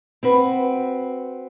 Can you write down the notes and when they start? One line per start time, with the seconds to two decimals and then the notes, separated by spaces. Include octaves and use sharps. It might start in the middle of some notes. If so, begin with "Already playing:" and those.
0.23 C4 F#4 B4